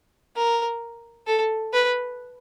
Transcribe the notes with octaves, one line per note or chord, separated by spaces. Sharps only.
A#4
A4
B4